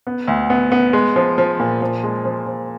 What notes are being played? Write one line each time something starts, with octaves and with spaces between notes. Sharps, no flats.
B3
D2
B3
B3
G#3
F3
F3
A#2
F3
G#3
F3
F3